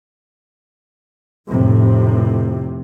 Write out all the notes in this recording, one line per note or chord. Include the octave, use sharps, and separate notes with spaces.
F1 A2 C3